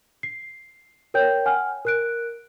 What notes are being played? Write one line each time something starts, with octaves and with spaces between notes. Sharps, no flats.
C7
A#4 C#5 G5 G6
F#5 G#5 F6
A#4 F#6 D7